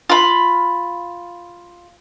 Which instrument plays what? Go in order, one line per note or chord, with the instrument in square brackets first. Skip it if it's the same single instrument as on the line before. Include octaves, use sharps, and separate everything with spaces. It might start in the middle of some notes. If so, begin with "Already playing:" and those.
[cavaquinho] F4 B5